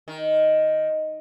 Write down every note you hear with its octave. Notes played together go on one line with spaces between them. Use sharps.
D#3